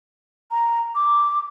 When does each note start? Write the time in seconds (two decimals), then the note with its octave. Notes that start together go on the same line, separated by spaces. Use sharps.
0.51 A#5
0.95 D6